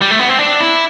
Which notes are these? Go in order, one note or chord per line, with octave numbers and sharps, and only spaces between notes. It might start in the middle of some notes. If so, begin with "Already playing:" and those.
G3
A3
B3
C4
D4
E4